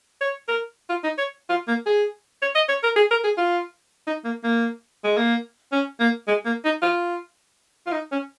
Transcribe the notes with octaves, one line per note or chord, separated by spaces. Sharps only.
C#5
A#4
F4
D#4
C#5
F4
A#3
G#4
C#5
D#5
C#5
A#4
G#4
A#4
G#4
F4
D#4
A#3
A#3
G#3
A#3
C#4
A#3
G#3
A#3
D#4
F4
F4
D#4
C#4